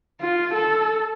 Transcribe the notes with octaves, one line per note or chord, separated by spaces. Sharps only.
F4
A4